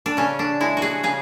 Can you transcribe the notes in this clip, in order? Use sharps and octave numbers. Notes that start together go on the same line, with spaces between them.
D4
C#3 C#4
D4
G#3 E4
F#4
G#4
C#3 G#4